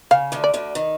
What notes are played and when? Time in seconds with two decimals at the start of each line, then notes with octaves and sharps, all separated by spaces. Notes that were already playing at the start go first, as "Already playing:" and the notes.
0.11 C#3 F5
0.32 D2 D3
0.44 D5
0.54 D2 D3
0.75 D#3